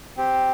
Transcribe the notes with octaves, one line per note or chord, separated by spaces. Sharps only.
C4 G4